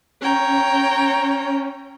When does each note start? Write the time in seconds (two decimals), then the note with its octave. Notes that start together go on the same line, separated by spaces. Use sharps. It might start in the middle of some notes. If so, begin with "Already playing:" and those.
0.22 C#4 C#5 G5 A#5